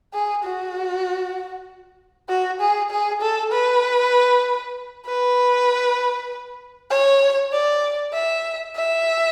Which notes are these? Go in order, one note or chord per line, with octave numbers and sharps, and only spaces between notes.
G#4
F#4
F#4
G#4
G#4
A4
B4
B4
C#5
D5
E5
E5